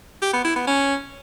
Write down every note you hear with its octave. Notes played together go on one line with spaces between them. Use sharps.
G4
B3
E4
B3
C#4